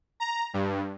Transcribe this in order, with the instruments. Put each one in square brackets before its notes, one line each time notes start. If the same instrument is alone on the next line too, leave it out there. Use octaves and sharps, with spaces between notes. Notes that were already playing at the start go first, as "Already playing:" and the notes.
[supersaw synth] A#5
G2